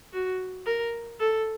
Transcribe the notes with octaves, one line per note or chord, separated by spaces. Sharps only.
F#4
A#4
A4